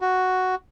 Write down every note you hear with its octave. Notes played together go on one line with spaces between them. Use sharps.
F#4